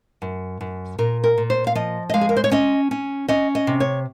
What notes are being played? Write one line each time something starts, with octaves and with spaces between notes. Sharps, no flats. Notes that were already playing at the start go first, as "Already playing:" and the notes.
F#2
F#2
A#2 A#4
A#4
A#2
C5
F5
F3 D#5
D#5
G#3 F5
G#4
A#4
C5
C#5
C#4 D#5
C#4
C#4 D#5
D#5
C3
C#5